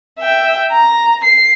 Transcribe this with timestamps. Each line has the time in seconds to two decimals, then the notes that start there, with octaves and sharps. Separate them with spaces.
0.20 E5 G5
0.71 A#5
1.24 C7